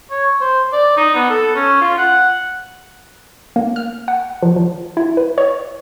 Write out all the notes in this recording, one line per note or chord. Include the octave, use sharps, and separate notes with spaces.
C#5
C5
D5
D#4
B3
A4
C#4
F4
F#5
A#3
F6
F#5
F3
F3
E4
B4
C#5